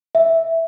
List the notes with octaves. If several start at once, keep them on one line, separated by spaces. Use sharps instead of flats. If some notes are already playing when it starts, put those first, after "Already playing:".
E5